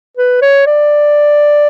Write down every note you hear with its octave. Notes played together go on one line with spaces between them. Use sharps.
B4
C#5
D5